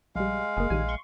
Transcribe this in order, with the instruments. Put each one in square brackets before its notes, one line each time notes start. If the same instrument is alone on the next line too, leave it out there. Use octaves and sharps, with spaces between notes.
[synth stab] A#1 G3 [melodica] G#3 F5
[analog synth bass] F#1 [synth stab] A#3 G#4
[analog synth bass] A#1 [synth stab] D#3 G3 G#5
[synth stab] C6 C#6